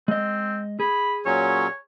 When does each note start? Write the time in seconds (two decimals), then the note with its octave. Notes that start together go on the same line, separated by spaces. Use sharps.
0.08 G#3 C4 D#5
0.80 G#4 B5
1.26 A#2 F#3 C#4 C#5